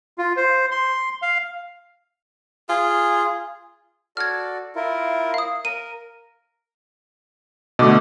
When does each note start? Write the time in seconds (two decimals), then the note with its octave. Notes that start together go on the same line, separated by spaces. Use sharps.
0.18 F4
0.37 C5
0.71 C6
1.22 F5
2.69 F4 G#4
4.17 F#4 A4 D5 F6 G#6
4.76 E4 F4 A#4
5.34 F5 D#6
5.65 A#4 D#7
7.79 B2 D3 A3 D#5 D6